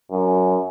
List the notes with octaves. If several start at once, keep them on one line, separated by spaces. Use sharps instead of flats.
F#2